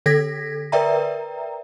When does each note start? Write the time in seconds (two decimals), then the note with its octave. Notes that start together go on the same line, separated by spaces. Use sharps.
0.06 D3 A4 G#6 A#6 B6
0.72 A#4 B4 D5 E5 G5 A#5